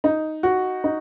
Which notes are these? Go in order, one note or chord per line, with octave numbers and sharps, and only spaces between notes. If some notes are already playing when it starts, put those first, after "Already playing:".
D#4
F#4
D#4